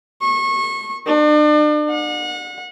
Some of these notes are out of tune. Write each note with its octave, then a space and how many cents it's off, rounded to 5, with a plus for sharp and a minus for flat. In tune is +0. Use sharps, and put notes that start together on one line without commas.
C#6 -30
D4 +40
F#5 -35